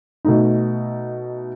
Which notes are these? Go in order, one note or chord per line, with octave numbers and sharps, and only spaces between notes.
B2 A3 D#4